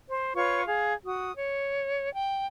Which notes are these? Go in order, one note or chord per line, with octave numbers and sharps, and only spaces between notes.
C5
F4 B4 C#5 C#6
G#4 F5
F#4 D#6
C#5
G5